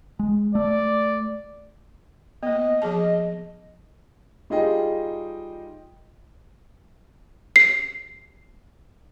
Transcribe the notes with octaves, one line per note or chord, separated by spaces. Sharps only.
G#3
A3 D5
A#3 B3 D#5
F3 G#4 A5
G3 D#4 F4 G#4 D#5 G5
C7